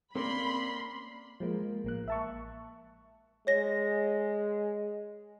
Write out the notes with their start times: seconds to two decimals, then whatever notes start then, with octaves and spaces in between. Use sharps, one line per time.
0.15 A#3 C4 C#4 D5 B5 C6
1.40 F3 G#3 A#3
1.84 A1 A#3 F#6
2.08 E5 A5 C#6
3.47 G#3 C#5 A#6